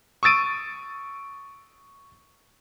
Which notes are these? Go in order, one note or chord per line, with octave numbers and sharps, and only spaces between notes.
C#6 D#6 E6 A6 D7 D#7